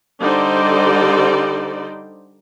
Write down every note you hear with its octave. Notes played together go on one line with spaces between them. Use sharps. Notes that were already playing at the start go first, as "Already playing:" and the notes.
D3 G3 D#4 C5 D5